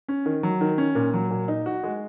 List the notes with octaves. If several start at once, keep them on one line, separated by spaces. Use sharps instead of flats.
C#4
D#3
F#3
D#3
C#4
A#2
F#3
A#2
D#4
F#4
G#3